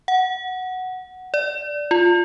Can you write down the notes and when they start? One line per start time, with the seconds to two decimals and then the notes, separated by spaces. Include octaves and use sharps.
0.08 F#5
1.34 D5
1.91 F4